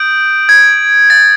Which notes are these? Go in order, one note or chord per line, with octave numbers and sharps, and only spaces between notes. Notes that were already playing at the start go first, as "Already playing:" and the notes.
Already playing: D#6 G6 D7
G#6
A6